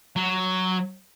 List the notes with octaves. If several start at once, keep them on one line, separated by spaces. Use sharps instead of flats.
F#3